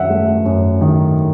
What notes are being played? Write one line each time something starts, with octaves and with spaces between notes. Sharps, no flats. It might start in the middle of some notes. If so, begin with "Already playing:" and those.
Already playing: F#2 D#3 E5 F#5
A3
F#2
D#3